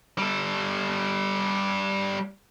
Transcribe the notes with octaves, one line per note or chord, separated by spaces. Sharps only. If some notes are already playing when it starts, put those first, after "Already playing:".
G3 A4